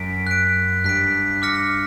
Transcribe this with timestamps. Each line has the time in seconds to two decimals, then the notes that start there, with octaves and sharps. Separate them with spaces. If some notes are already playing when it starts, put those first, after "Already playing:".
Already playing: F#2 B6 D7
0.27 F#6 B6 D7
0.84 G2 F#6 B6 D7
1.42 D6 F6 A#6 C#7